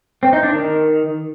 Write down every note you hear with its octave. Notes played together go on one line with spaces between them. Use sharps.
C4
D#4
D4
D#3